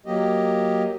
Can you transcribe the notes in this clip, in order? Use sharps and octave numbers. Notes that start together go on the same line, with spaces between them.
F#3 A#3 G4 D#5